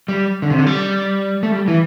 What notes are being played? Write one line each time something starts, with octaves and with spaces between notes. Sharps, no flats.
G3
D3
C3
D3
G3
A3
G3
E3